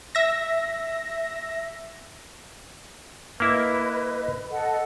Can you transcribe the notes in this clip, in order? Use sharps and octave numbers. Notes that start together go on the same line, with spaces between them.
E5 A#6
A#3 E4 B4 D#5
A4 D#5 F#5